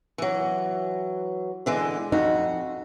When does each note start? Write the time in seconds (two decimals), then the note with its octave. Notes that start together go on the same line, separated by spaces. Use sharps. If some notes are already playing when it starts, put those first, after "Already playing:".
0.18 E3 F#3
1.66 D3 E3 G#3
2.12 F2 D#4 F#4